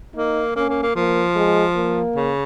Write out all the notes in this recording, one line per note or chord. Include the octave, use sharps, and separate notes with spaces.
A#3 D#4
A#3 C#4
A#3
A#3
F3 A#3
G#3
A#3
C#3